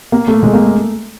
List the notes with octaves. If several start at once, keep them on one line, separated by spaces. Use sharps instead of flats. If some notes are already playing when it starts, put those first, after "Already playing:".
A#3
A3
G#3
A#3
A3